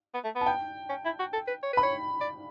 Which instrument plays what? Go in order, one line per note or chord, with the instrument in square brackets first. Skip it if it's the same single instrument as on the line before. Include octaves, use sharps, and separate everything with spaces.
[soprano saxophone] B3
A3
B3
[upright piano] A5
G5
[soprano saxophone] C#4
E4
F#4
A4
B4
C#5
[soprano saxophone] B4 [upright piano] B5
[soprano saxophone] C#5
D5